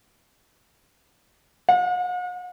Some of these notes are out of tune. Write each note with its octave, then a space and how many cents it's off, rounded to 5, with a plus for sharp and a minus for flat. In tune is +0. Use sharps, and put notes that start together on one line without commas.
F#5 -45